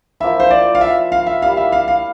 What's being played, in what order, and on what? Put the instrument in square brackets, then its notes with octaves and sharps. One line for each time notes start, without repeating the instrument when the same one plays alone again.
[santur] F3 A#3 E4 [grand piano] E5
[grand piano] C5
D5
F5
E5
F5
E5
[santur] G3 A#3 E4 G4 [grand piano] F5
[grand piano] E5
F5
F5